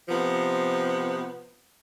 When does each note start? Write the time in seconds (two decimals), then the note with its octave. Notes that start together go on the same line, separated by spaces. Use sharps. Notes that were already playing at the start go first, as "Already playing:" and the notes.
0.09 C3 F3 B3